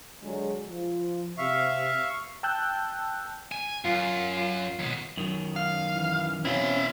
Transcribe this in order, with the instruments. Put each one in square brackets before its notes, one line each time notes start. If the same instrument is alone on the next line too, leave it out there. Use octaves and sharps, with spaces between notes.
[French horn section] D3 F#3 G#3
F3
[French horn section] C3 [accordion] E5 F5 C#6
[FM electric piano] G5 A5 E6 F#6 G6
[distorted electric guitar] G#5
[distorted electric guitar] F#2 [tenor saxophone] F4
[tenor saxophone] F4
[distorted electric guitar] D#2 B2
[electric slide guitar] F#2 D#3 F#3
[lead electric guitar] F5
[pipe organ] E3
[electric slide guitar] B2 E3 C4 [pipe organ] C#4 [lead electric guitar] E4 F5